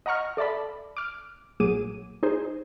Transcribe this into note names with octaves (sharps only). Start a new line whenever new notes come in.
D#5 F#5 A#5 C#6 F6
A4 D5 E5 A5 B5
D6 F6
B1 A#2 F#3 G#4 D6 D#7
D#4 G#4 C5